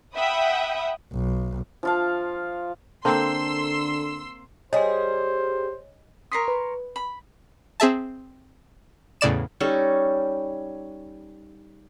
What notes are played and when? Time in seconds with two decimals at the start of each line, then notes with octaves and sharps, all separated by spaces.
0.16 E5 F#5 G5 B5 D#6
1.12 B1
1.83 F3 F4 F5
3.05 D3 A#3 C4 A4 C6 E6
4.73 G3 G#4 C5 C#5 D#5 G#5
6.32 A#4 C#5 C6 D#6 B6 C7
6.48 B4
6.96 B5
7.80 C4 G#4 E5 A5
9.21 E2 A2 C#3 D5 E7
9.60 G3 C#4 D#4 A4